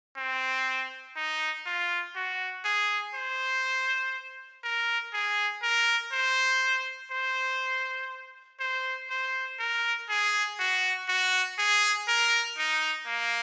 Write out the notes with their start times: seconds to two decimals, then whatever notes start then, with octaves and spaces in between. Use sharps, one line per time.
0.17 C4
1.16 D#4
1.66 F4
2.16 F#4
2.65 G#4
3.15 C5
4.64 A#4
5.13 G#4
5.62 A#4
6.12 C5
7.12 C5
8.60 C5
9.10 C5
9.59 A#4
10.09 G#4
10.59 F#4
11.09 F#4
11.58 G#4
12.08 A#4
12.58 D#4
13.07 A#3